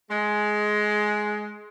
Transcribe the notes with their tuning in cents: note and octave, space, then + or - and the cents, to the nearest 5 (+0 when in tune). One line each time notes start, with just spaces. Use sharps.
G#3 +15